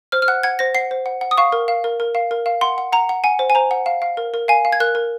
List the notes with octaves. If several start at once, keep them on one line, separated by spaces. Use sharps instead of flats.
C5 F6
F6
F#5 F#6
F#5 G#6
C5 A#6
F#5 C7
C5
F#5
F#5
D#6
F5 C#6
A#4
F5
A#4
A#4
F5
A#4
F5
F#5 C6
F#5
F#5 A#5
F#5
F#5 G#5
C5
G#5
C5 A#5
F#5
F5
F5
A#4
A#4
F5 G#5
F5
G#6
A#4 F#6
A#4